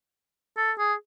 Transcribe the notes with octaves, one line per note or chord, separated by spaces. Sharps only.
A4
G#4